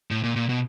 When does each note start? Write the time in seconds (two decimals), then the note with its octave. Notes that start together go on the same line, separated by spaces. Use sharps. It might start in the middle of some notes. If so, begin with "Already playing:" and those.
0.11 A2
0.23 A#2
0.36 A#2
0.49 B2